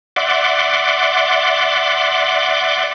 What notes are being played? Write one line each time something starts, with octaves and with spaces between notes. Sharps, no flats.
D5 E5 F#5 C6 D6